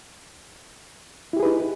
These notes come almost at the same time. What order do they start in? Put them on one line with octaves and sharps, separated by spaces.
E4 G4 G#4 B4 D#4